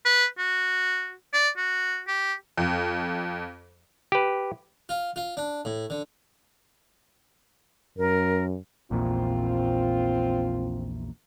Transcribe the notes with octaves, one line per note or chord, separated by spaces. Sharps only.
B4
F#4
D5
F#4
G4
F2
G4 B4
F4
F4
D4
A2
D3
F#2 A#4
A#1 E2 A#2 C4 F4